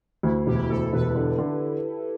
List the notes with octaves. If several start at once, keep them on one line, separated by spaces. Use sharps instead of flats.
D2 E4
E1 G4
E4
G4
D2 A4
E1 B4
D3
D3